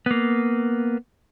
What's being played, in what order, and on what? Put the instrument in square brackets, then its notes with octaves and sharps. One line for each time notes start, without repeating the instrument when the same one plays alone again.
[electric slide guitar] A#3 B3